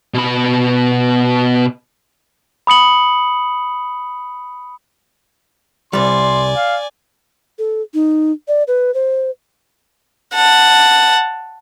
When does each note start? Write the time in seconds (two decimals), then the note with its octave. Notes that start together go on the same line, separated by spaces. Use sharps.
0.14 B2 B5
2.67 B5 D#6 C#7 F#7
5.93 C2 G3 D5 G#5 C6
6.56 F5
7.59 A4
7.94 D#4
8.48 D5
8.68 B4
8.94 C5
10.35 F#5 A5